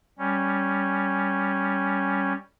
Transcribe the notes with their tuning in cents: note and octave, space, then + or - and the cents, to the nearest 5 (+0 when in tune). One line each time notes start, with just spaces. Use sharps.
G3 +0 C#4 +0